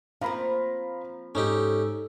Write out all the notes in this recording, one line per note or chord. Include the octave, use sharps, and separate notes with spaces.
F3 A#3 C4 F5 A#5 B5
G#2 C#4 D#4 G4 A4